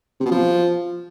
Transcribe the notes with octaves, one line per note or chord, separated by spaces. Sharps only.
C3
B2
F3